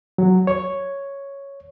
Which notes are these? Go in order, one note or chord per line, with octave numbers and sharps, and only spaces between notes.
F#3
C#5